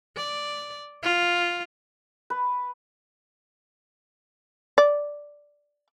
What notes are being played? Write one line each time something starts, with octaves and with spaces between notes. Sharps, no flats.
D5
F4
B4
D5